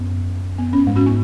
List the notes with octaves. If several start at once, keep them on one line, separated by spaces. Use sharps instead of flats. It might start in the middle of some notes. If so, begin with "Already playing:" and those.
Already playing: F#2 B3
B3
C#4
G#2 G#3
C#4 F#4
B3 D#4